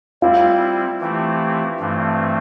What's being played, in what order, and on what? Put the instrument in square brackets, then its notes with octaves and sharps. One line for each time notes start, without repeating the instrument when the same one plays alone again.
[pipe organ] G3 C4 E4 [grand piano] F4
[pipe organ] E3 A3 C4 E4 G4
G2 E3 A3 C4